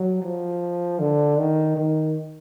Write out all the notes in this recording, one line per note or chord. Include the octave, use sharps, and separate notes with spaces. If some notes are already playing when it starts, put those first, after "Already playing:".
Already playing: F#3
F3
D3
D#3
D#3